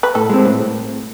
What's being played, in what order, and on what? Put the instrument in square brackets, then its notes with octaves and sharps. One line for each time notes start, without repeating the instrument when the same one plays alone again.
[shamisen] B4
[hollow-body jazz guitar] A2 [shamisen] A4
[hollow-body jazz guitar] G#3 C4
A2